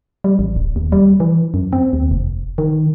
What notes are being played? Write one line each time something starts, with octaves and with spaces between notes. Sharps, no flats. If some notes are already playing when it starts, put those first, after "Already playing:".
G3
A1
D1
D#2
G3
E3
F#2
C4
D#2
F1
D#3